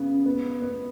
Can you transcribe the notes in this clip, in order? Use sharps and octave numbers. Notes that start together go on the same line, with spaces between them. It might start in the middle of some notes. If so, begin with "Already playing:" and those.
Already playing: C#3 B3
B3
B3